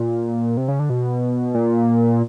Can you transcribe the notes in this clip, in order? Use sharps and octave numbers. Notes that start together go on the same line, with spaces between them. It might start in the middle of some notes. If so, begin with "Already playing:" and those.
Already playing: A#2
C3
C#3
D3
B2
A#2